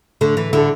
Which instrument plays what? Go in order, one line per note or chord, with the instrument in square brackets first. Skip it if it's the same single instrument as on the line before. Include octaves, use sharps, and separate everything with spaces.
[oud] D3 [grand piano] A3
[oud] E3
[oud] D3 [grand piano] E4 A4